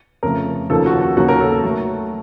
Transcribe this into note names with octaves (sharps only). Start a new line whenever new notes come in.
F2 C#3 A3 A#4
D#2 C#3 F3 A#3 A4
F#4
F#4
D#2 C#3 F#3 A#3 F#4
A#4
A4
A4
F#3 A3